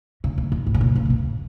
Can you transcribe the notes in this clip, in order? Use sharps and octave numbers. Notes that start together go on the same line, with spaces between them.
C#3
C#3
F2
G#2
C#3
A#2
C#3
A#2
C#3